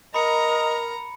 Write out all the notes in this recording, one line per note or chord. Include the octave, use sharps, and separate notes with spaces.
A#4 D#5 A#5 B5 C#7